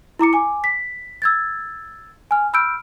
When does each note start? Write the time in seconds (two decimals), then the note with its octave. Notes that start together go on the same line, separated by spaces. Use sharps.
0.19 E4 A#5 D6 C#7
0.33 G#5 D6
0.64 B6
1.22 E6 G#6 A6
2.31 G#5 F6
2.53 B5 E6 F6 G6 D7